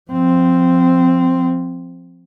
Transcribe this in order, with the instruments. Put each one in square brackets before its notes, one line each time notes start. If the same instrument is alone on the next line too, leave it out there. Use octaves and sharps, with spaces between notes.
[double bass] F3 C4